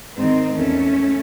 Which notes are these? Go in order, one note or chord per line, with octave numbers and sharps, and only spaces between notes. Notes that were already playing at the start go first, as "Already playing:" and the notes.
G#2 D#3 C4 D#4
E2 D#3 A3 C#4